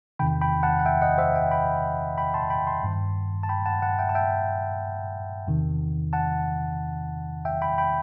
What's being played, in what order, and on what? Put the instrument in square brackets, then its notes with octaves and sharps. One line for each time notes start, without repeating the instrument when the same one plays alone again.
[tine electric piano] E2 C3 D#3 G5 B5
G5 B5
F#5 A5
F#5
E5 G5
D#5 F#5
C5 E5
E5 G5
G5 B5
G5 B5
A5 C6
G5 B5
A5 C6
G2 D#3
A5
G5 B5
F#5 A5
F#5 A5
E5 G5
A5
E5 G5
E2 C3 D#3
F#5 A5
E5 G5
G5 B5
G5 B5